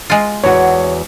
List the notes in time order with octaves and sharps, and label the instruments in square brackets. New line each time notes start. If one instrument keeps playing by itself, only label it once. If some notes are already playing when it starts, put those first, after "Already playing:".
[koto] G#3 F4
[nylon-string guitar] E2 F#4 [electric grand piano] C#5